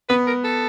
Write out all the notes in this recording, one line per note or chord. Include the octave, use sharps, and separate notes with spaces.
B3 B4
A#4
A4